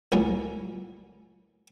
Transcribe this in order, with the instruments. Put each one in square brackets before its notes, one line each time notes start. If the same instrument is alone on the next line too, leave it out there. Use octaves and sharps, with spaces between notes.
[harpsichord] C#2 A2 F#3 A#3 C#4